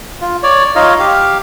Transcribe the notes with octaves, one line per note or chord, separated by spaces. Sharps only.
F4
C#5 D5
D#4 F4 C#5 D#5 F5
G4 F5